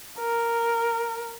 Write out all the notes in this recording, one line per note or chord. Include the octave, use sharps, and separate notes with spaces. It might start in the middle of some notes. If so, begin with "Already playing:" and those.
A#4